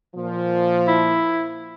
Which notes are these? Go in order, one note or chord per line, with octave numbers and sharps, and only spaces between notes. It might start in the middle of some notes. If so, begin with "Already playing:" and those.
A#2 F3
E4